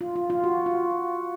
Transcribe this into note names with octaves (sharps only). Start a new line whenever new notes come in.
F4
F4
F4
F#4
F4